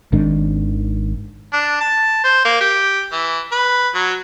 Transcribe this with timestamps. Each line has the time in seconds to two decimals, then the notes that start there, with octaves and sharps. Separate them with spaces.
0.12 G#1 G#2 D#3 D4
1.53 D4
1.81 A5
2.24 C5
2.45 A#3
2.61 G4
3.12 E3
3.52 B4
3.94 F#3